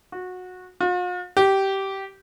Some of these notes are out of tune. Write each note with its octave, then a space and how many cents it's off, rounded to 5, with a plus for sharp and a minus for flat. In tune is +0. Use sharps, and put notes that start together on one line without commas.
F#4 -20
F4 +45
G4 -15